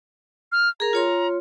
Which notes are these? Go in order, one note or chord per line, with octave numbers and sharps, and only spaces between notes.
F6
G#4 A#4 A#5
F4 C#5 C6